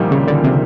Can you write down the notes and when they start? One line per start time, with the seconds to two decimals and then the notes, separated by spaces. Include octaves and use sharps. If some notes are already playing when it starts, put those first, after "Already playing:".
Already playing: C2 A#2 D#3 F3 G3 A#3
0.11 C#3
0.27 D3
0.43 C3